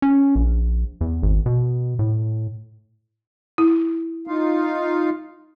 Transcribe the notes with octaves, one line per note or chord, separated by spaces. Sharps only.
C#4
A#1
E2
G#1
B2
A2
E4
D#4 F4 F5